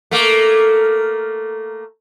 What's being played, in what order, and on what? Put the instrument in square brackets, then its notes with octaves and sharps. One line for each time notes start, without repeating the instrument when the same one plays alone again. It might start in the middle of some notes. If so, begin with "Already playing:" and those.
[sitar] A3 A#3